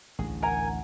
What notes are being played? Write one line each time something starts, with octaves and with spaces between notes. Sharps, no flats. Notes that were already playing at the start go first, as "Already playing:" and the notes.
A1 D2 G#4
A#4 F#5 G#5 A#5